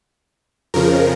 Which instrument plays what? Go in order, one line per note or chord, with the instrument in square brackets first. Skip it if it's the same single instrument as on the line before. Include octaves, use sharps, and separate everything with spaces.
[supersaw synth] F2 C#3 F3 A#4